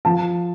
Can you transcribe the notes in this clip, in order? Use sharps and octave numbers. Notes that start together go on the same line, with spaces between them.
F3 A5